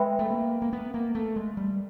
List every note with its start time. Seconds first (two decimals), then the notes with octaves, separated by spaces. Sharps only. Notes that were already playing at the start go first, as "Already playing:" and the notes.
Already playing: G#3 B4 E5 G5 B5
0.19 A3
0.30 A#3
0.62 A#3
0.73 B3
0.94 A#3
1.15 A3
1.36 G#3
1.57 G3